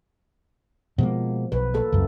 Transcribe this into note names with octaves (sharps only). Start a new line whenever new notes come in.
B2 F3 G#3 A#3
B1 B4
A#3 A4
C#2 F#2